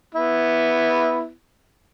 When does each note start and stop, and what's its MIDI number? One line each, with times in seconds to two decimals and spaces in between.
0.15 1.30 59
0.15 1.30 64